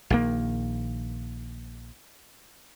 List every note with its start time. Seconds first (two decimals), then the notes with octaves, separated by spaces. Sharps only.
0.10 A#1 D#3 A#3